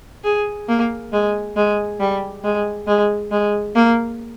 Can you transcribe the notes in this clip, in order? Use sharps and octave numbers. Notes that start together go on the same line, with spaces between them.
G#4
A#3
G#3
G#3
G3
G#3
G#3
G#3
A#3